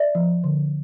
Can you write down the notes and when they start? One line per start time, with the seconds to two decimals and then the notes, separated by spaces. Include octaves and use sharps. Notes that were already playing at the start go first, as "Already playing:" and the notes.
Already playing: D5 E5
0.15 F3
0.44 D3